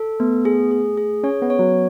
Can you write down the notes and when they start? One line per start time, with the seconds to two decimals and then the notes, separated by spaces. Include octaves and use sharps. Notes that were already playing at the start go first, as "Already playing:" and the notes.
Already playing: A4
0.20 A3 B3
0.45 G#4
0.71 G#4
0.97 G#4
1.24 C#4 C#5
1.42 B3
1.50 C#5
1.59 F#3